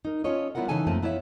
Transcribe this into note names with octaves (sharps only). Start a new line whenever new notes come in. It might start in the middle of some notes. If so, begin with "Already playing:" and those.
D#4 A#4
C#4 F4 A4 C#5 D#5
G3 B3 E4 F4 A#4 F#5
C#3 E3 D#4 A4 G#5 A5
F#2 F3 A3 A#3 C4 A5
B3 E4 C#5 D5 E5 F5